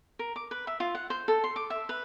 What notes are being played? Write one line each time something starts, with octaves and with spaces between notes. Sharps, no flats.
A#4
D6
B4
E5
F4
F#5
C5
A4
C6
D6
E5
B4